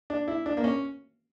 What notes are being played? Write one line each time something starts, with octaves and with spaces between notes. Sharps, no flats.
D4
E4
D4
A#3
C#4